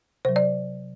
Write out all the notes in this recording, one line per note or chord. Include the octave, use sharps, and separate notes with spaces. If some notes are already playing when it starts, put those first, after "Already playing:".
C3 F#3 C5
D5